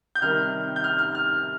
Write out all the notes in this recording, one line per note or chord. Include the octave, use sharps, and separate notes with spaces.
G6
C3 D#3 G3 F6
G6
F6
F6
F6